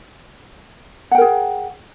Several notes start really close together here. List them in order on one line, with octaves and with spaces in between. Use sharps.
F#5 G5 A#4 G#4